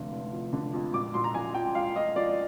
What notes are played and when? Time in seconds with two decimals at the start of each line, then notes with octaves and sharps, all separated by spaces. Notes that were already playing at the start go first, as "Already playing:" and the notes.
Already playing: F1 D3
0.12 F1
0.33 F2
0.53 D3
0.74 F2
0.94 A#1 D6
1.14 A#1 C6
1.24 A#5
1.35 A#1 G#5
1.54 F3 G5
1.75 F3 F5
1.96 F3 D#5
2.16 F3 D5